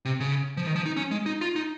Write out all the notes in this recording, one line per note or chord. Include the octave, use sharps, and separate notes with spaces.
C3
C#3
F3
D#3
F3
D#4
C#4
G#3
D#4
F4
D#4